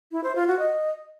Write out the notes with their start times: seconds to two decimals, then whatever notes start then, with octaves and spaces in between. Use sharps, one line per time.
0.12 E4
0.24 C5
0.35 F4
0.47 F#4
0.59 D#5